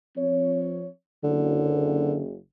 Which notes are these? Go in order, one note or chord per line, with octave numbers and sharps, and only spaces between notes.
F3 C4 C#5
F#1 D3